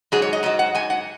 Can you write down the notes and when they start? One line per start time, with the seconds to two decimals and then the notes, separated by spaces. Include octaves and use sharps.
0.12 G#2 F#3 G#4
0.22 C#5
0.33 D#5
0.43 G#2 F#3 D#5
0.59 F#5
0.75 G#2 F#3 G#5
0.90 F#5